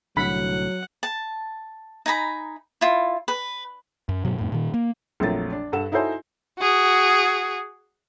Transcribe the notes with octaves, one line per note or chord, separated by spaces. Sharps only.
C2 A2 D3 F#3 F#5 B5
A5
D#4 G#5 A#5 B5
E4 F4
B4
F#2
G2 B2 F#3
F2 A2
A#2 D#3
A#3
A#1 F2 F3 F#3 A3 A6
D4
G2 A4 F#5 E7
D#4 E4 F#4 A4 C5 G#5
F#4 G#4